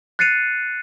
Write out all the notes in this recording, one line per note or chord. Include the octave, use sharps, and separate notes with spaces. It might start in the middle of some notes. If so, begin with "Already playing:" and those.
F#6 A6 C7 C#7 D#7 F7